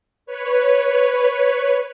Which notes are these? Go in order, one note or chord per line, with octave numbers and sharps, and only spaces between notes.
B4 C#5